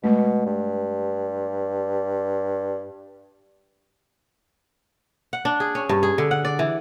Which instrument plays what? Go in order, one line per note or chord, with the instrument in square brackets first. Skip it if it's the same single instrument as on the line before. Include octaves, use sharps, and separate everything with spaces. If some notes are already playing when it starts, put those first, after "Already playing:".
[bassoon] B2 [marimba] G#3 A3
[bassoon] G2
[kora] F#5
D4
G#4
C#4
G2
G#4
D3
F#5
D5
E3